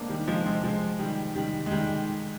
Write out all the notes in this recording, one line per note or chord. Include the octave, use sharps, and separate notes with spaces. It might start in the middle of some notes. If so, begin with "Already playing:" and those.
Already playing: G#3 A#3 C4 D4
D#3 G3
F3 G#3
G#3 C4
F3 G#3
D#3 G3
D#3 G3
G#3
D#3 G3